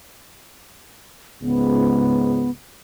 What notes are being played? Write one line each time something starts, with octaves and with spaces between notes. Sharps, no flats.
C#2 G#2 B3